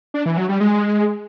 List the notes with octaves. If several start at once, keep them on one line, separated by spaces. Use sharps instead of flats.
D4
E3
F#3
G3
G#3